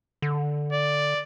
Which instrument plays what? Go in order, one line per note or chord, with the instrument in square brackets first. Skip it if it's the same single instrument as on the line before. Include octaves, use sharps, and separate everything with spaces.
[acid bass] D3
[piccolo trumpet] D5